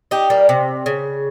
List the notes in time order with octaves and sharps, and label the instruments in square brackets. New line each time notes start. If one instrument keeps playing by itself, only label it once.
[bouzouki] D#4 G4
G3 A#3
C3
C#3